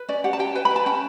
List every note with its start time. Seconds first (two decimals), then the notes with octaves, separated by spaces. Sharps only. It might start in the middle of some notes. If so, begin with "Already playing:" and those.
Already playing: B4
0.09 C#4 D5
0.24 G4 F#5
0.33 A5
0.39 G4 G5
0.55 B4 G5
0.65 B5
0.71 B4 A5
0.86 C#4 G5